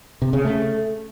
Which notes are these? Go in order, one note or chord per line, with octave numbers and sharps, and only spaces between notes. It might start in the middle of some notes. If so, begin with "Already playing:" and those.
C3
C#3
A3